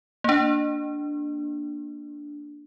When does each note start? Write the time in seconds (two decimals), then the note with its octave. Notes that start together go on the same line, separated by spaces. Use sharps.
0.24 A#3 D4